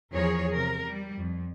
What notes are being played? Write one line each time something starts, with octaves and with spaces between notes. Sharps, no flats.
E2 F3 G#4 A#4 C#5
C3 A#4
G3
F2